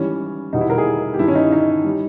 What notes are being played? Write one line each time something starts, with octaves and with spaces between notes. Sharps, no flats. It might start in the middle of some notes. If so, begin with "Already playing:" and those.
Already playing: G#2 E3 G3 C#4
E2 B2 G3 D#4
E4
A#4
G#4
G4
G2 D#3 G3 E4
C#4
D#4
D#4
G3